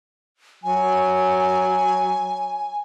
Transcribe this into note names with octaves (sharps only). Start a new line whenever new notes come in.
F#3 G#5